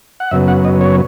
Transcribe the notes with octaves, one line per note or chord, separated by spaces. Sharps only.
F#5
F#2 C#3 F#3 B3 E5
F#5
D#5
C#5